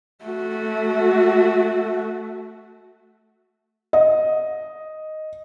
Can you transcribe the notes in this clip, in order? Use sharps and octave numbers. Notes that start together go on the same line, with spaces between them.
A3 F#4
D#5